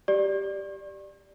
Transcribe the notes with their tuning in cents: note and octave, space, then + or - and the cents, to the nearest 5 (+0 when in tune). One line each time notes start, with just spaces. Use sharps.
G4 +0 D5 +5